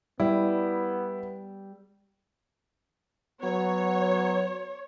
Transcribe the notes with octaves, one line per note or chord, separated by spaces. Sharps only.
G3 B3 E4
F#3 B3 C#5